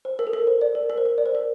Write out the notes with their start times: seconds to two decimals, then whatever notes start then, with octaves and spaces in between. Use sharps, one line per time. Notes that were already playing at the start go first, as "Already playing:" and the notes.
0.05 C5
0.19 A#4
0.27 A4
0.33 A#4
0.47 C5
0.61 D5
0.75 A#4
0.90 A#4
0.98 C5
1.06 A#4
1.18 D5
1.26 C5
1.35 A#4